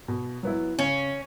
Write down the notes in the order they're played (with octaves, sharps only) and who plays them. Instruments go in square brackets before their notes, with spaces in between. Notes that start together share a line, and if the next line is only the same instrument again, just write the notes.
[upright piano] B2
F#3 B3 E4
[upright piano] C#3 [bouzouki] C#4